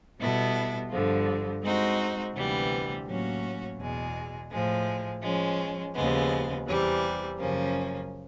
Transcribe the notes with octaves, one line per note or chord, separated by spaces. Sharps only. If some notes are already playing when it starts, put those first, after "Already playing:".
B2 G3 B3 E4 A4
G2 D3 F3
G#3 C4 D#4 F#4
D2 C3 E3 G3 B3
A2 F#3 A#3 C#4 F#4
E2 B2 G#3
A2 F3 G#3
F3 G#3 C#4
D#2 C#3 F3 G#3 B3
E2 C3 E3 G3
F#2 C#3 F3 A#3 C#4